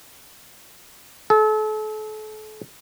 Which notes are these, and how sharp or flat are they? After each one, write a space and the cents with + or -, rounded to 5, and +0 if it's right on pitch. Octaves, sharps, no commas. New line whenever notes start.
A4 -35